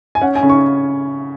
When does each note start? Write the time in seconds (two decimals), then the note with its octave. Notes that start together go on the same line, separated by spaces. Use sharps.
0.15 G#5
0.21 C#4 F#5
0.35 G#5
0.43 C#3
0.50 C#6